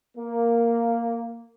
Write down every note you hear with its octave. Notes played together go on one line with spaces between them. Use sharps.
A#3